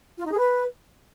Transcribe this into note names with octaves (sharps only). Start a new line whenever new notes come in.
F4
D#4
G#4
B4